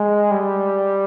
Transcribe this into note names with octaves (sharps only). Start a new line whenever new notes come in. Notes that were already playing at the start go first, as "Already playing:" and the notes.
Already playing: G#3
G3